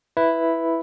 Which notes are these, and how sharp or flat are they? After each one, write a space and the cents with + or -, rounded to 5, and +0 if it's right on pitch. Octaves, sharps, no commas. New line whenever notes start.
E4 +0 B4 +0